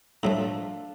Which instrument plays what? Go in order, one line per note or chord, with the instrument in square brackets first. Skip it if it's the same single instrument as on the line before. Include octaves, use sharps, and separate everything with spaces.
[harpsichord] A2 F3 A3 [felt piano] D4 F4